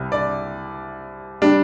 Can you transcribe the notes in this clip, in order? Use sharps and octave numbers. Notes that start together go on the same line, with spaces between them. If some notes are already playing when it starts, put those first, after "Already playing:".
Already playing: C2 C3 G3
D5
G3 D4